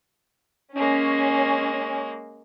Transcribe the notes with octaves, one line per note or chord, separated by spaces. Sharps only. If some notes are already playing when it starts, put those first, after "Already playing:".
G#3 A#3 C#4